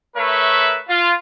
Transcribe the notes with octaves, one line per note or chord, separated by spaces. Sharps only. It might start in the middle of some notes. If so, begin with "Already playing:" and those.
A3 A#4 B4 C#5 E5
F4